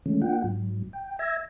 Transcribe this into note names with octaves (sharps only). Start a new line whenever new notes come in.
D3 E3 G#3 A3 C#4
A#3 D4 F4 F#5 G5
G#2 F#3
G5
E5 E6 G#6 A#6